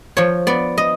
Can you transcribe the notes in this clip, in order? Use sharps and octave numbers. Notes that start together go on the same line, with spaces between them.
F3 C#5
B3 D5
D#5